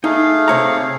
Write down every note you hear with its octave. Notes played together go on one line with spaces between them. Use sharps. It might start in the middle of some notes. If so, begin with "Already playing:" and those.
A3 D#4 G#4 F5
C3 C#5 A#5